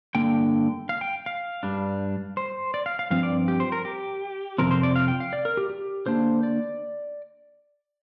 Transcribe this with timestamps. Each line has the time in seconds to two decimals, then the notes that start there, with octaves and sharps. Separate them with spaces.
0.15 G2 D3 A#3 D4 G5
0.89 F5
1.01 G5
1.26 F5
1.63 G2 G3 D4
2.37 C5
2.74 D5
2.86 F5
2.99 F5
3.10 G2 F3 C4 F5
3.23 D5
3.48 G4
3.60 C5
3.72 A#4
3.85 G4
4.58 F2 C3 F3 C4 A#4
4.71 C5
4.83 D5
4.96 F5
5.08 G5
5.20 F5
5.33 D5
5.45 A#4
5.57 G4
5.70 G4
6.06 D3 A#3 D4 C5
6.43 D5